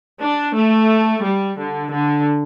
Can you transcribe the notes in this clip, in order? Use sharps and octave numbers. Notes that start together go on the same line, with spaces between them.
D4
A3
G3
D3
D3